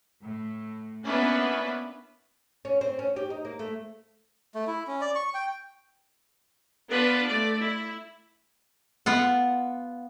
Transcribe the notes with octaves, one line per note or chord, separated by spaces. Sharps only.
A2
A#3 B3 C#4 D4 E4 B4
C#4
C4
C#4
G4
D#4
A#3
A3
A3
E4
C#4
D5
C#6
G5
B3 D4 F4 B4
A3 D5
E4
B3 F4 F#5